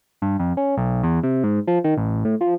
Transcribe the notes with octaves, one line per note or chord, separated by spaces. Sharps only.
G2
F2
C#4
B1
E2
C3
G#2
F3
D#3
A1
A2
F3